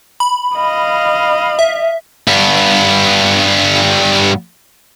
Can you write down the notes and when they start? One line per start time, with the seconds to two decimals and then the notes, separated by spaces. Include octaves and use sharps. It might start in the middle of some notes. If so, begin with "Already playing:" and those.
0.20 B5
0.56 D#5 F5
1.59 E5
2.27 G2 B3